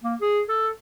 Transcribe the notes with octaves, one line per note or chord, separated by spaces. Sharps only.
A#3
G#4
A4